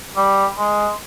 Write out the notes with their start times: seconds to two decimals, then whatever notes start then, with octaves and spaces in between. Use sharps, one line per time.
0.16 G3
0.58 G#3